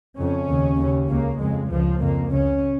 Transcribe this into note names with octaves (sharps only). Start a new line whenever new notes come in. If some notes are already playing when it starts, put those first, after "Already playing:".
F2 C#3 C#4
D#2 C#3
D#2 C#3
C#2 C#3 A#3
F2 C#3 G#3
C#2 C#3 F3
F2 C#3 A#3
C#2 C#3 C#4